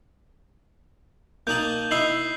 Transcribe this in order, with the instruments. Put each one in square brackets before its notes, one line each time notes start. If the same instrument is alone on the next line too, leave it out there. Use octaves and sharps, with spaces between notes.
[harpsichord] A#3 D#4 A5 [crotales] G6 F#7
[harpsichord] D#4 E4 [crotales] E6 C7 F#7